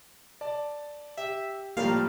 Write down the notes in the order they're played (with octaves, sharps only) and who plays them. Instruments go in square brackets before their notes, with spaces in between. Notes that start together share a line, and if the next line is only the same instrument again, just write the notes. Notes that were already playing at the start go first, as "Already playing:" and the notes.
[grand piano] D5 A5
[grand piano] G4 [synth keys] E5
[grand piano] A2 F3 G3 [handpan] A#3 G4 A#4 [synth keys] F5